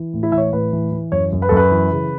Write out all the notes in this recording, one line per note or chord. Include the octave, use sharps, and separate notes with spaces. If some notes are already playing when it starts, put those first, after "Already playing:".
Already playing: E3
A2
E4
E3 E5
C#5
A2 B4
E3
E3
F#2 C#5
F#2
B4
F#2 A4
B4
E3
C#3